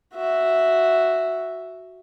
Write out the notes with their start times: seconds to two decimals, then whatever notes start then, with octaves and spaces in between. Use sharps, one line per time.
0.14 F#4 E5